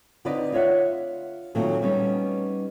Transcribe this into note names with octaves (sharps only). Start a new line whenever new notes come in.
D3 C4 D#4 B4 D5 D#5
F4 C#5 E5 F#5
A#2 D#3 F#3 A3 A#3 C4
G3 B3 C#4 D#4